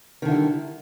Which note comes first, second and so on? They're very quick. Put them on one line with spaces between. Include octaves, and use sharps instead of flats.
D#3 D3 E4 G3